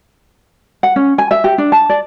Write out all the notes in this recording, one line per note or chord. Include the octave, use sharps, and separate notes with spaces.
F#5
C#4
G#5
E5
G4
D4
A5
D5